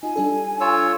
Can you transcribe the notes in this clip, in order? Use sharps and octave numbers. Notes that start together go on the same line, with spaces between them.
D#4 F4 G#5
G3 D4 A4
F4 C#5 E6